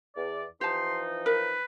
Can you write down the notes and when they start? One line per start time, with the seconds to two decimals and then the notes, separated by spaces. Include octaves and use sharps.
0.16 E2 D5
0.61 E3 F3 D#4 G4 A5 C6
1.26 A#4 B4